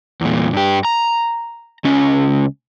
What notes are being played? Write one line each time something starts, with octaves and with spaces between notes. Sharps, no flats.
E2 A#2
G2 G4
A#5
C#2 C#4